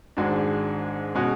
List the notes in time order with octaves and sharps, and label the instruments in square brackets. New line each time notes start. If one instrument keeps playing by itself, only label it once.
[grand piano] G#1 G#2 G#3 D4 F#4
B2 G#3 C#4 F#4